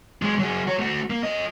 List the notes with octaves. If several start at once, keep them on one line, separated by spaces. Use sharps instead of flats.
F#3 G#3
F#3 G#4
F#4 C#5
A3 F#4
A#3
A4 D#5